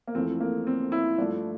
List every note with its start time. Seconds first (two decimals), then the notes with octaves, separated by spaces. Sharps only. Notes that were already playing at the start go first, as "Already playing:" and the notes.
0.07 A#3
0.15 F2 E3 A3 C4
0.40 A#3
0.67 C4
0.92 E4
1.18 G2 F3 A3 D4